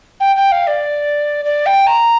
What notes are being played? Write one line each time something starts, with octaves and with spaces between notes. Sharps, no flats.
G5
G5
F5
D5
D5
G5
A#5